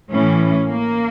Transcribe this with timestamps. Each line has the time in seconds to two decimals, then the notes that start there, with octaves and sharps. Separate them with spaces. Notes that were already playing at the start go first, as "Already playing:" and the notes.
0.11 A2 E3 C#4
0.69 A#3